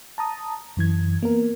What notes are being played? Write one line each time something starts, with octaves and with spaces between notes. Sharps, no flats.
A5 A#5 D#6
F#2 E3 G#6
A#3 B3 A#4